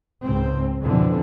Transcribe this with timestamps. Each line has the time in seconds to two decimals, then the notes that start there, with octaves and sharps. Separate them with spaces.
0.24 C#2 G#2 C4
0.83 F2 B2 D3 E3 F3